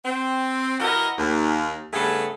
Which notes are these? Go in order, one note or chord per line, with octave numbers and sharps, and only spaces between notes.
C4
E3 F#4 G4 A#4 D#5
D#2
G2 C#3 A3 B3 G#4 A4